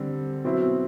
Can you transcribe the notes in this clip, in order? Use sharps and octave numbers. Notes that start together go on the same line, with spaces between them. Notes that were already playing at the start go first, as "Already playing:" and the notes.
Already playing: D3 G3 C4
B2 F#3 C4 E4